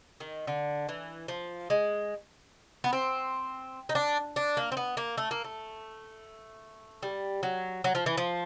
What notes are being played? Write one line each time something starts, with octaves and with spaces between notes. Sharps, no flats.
D#3
D3
E3
F3
G#3
B3
C4
D#4
D4
D4
A#3
C4
B3
A#3
A3
A#3
A3
G3
F#3
F#3
F3
E3
F3